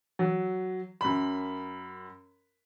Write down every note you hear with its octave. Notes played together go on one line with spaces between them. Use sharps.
F#3
F#2 B5